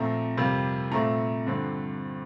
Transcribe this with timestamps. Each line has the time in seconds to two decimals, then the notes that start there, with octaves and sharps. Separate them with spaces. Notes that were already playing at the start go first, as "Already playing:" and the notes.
Already playing: A#2 F3 A3 C4 A#5
0.37 F2 C3 G3 A#3
0.91 A#2 A3 C4 A#5
1.47 G2 D3 F3 C4